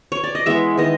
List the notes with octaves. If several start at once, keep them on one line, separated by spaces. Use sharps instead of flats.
C#5
D5
D#5
E3 G#3 B3 E5
D#3 G#3 B3 D#5